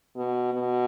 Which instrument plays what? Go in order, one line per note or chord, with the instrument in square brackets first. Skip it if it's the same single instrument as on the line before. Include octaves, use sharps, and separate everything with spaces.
[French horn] B2
B2